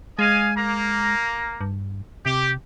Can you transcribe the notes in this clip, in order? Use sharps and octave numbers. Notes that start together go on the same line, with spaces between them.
G#3 D#5 F5 G#5
A#3 A#5
G2
C3 G4